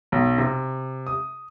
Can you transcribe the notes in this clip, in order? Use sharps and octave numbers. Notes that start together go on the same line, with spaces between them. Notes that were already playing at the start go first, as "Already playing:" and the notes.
B1
C3
D#6